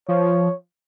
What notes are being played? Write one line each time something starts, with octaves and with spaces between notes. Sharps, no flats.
F3 C#5